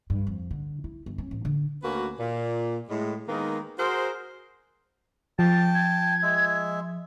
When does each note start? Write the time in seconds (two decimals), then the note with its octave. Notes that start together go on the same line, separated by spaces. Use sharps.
0.10 G2
0.27 F2
0.51 D3
0.84 E4
1.06 G1
1.18 C#4
1.31 A1
1.45 D3
1.83 D2 A#3 C#4 F#4 B4
2.20 A#2
2.89 A2 G#3
3.29 D#3 G#3 A#3 B3 D#4
3.78 F#4 G#4 A#4 C5
5.39 F3 G5 A5 A6
5.75 G#6
6.23 G#3 E5